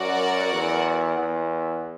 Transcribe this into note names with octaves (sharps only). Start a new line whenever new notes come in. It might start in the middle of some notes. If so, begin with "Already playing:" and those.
Already playing: F#2 F#4 A#4 D5 F#5
E2
E2